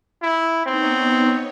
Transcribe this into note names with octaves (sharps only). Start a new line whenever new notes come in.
E4
B3 C4 D#4 C#5